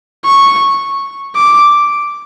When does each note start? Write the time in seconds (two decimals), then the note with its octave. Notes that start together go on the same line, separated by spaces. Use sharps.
0.25 C#6
1.36 D6